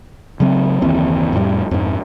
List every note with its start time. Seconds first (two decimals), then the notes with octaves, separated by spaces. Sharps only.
0.40 C#3 F#3 C4
0.82 F#1 D#2 E3 C4
1.33 F2 A2 G3
1.71 F2 G#2